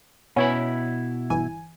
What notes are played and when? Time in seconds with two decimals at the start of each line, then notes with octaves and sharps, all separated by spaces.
0.36 B2 B3 C#4 E4 B5
1.30 G1 E3 G#5